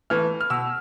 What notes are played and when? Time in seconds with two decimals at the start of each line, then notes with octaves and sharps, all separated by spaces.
0.10 E3 A3 F6
0.41 F6
0.50 B2 E6